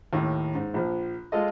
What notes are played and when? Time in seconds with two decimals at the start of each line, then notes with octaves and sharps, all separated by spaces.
0.13 D#2 A2
0.55 G#2
0.74 A#1 F3
1.32 G#3 F4 A4 D#5